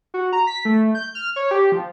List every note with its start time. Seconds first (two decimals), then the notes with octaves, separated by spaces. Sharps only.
0.14 F#4
0.33 A#5
0.47 B6
0.65 A3
0.95 G6
1.15 F6
1.36 C#5
1.51 G4
1.72 F3